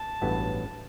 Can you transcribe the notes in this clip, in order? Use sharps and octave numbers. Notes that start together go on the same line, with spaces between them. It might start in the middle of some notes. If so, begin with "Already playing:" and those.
Already playing: A5
A1 G2 F#3 B3 E4